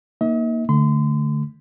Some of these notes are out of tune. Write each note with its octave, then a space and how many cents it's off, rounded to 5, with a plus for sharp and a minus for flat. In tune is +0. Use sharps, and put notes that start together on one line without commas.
A#3 +0 D#4 +0 D#5 +45
D3 +0 A3 +0 C6 -35